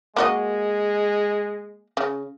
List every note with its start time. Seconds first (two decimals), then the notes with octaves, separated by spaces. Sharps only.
0.16 G#3 A#3 F#4 D#5
1.97 C#3